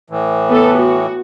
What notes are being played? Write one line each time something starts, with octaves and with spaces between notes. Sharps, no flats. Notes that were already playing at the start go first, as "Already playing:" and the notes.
A2 E3
B3 A4
F#4